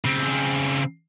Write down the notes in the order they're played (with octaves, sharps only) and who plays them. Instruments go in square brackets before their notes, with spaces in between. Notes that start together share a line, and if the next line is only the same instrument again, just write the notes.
[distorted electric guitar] C#3 C4